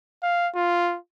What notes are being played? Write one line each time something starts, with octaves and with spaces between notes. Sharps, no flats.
F5
F4